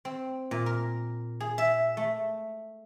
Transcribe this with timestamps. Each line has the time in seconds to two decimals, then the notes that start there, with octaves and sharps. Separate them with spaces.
0.05 C4
0.51 A#2
0.66 A#4
1.40 G#4
1.58 E5
1.97 A3